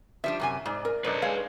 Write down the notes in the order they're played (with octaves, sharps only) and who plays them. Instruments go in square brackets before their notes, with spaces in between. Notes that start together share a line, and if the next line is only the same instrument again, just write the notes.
[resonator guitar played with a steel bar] F3 G3 D4 [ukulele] E5
[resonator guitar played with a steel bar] F#2 C3 G#5
[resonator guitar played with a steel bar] G#2 [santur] D5
[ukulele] A#4
[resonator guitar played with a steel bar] F#2 [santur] D4 D#4 A4 [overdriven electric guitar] B4 C#5
[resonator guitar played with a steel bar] G#3 [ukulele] F5 [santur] G#5